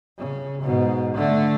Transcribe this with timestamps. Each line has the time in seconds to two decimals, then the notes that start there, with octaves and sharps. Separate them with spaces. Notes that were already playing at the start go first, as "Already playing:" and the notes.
0.18 C#3
0.62 G#2 B2
1.15 D3 A3